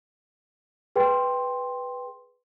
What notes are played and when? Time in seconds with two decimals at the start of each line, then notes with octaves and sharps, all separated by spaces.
0.96 G#4 B4 G5 C6